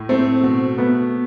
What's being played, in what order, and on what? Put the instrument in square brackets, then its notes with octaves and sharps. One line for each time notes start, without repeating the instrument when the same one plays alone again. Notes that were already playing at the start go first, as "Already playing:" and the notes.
Already playing: [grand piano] A2
[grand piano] A3 [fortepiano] C4
[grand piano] B2
[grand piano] A3 [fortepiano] B3